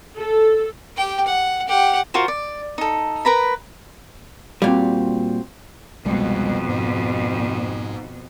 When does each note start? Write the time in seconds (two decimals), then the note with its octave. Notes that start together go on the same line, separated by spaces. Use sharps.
0.18 A4
0.97 G4 G5
1.26 F#5
1.68 G4 F#5
2.14 F4 F#4 A#4 C5
2.28 D5
2.78 D#4 A4
3.25 A#4 B4 A#5 B5
4.62 A#2 G3 C4 F#4 F5
6.05 C2 F2 B2 G3 G#3
6.69 G#2